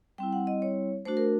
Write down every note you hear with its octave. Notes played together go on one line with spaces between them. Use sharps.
G3 C4 E4 G5
F#5
D#5
C#5
A3 D4 F#4 C5
A#4